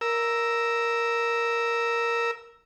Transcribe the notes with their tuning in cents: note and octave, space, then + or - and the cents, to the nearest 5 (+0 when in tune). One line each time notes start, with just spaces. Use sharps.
A#4 +0 E6 +0